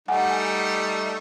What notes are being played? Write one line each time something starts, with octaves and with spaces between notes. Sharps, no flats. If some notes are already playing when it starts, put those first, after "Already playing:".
G3 A3 D#4 F#5 G#5